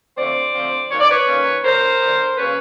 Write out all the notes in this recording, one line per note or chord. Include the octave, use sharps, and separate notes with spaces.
D3 F3 A3 C4 C5 D5
D3 F3 A3 C4
D#3 F#3 A#3 C#4 C#5
D5
B4 C#5
D#3 F#3 A#3 C#4
D3 F#3 B3 A#4 C5
D3 F#3 B3
C#3 F#3 A#3 C#4 B4 C#5